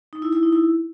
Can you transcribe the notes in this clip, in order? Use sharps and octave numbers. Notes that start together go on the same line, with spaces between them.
D#4
E4
E4
D#4
E4